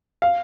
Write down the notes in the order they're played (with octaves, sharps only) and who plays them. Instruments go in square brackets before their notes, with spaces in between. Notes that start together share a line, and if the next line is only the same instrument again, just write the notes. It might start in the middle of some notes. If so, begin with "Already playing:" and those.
[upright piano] F5